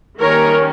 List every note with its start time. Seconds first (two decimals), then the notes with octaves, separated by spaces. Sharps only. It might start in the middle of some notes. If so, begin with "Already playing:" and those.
0.20 D#3 G3 A#3 C#4 A#4 C#5